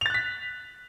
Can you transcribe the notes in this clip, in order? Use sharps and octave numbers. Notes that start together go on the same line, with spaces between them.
F#6 A6 B6 F7